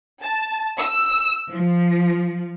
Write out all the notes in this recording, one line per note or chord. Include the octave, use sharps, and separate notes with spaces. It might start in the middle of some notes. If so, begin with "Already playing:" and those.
A5
E6
F3